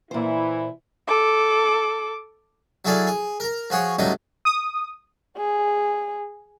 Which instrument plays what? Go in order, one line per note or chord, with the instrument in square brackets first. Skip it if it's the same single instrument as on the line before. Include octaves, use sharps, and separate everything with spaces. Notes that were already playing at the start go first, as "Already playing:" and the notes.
[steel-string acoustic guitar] A#2 C5 [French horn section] E3 E4
[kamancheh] A4 D6
[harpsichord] F#3 E4 G#4 A4 D5 F5
G#4
A#4 A#5
F3 F#4 G#4 C#5
C#2 A2 F#3 G3 D#4 D#5
[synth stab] D#6
[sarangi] G#4